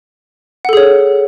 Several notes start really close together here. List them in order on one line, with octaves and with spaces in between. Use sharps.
F#5 A4 G#4 C#5